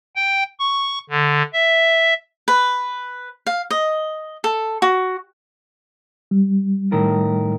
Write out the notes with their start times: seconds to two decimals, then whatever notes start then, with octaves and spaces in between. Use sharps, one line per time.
0.16 G5
0.60 C#6
1.10 D3
1.53 E5
2.48 B4
3.46 F5
3.71 D#5
4.44 A4
4.82 F#4
6.31 G3
6.92 A2 D#3 A#4